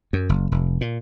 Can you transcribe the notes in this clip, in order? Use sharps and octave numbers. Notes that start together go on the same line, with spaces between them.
F#2
F#1
F1
A#2